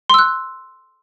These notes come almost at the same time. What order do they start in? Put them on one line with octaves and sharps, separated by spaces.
C6 E6 F#6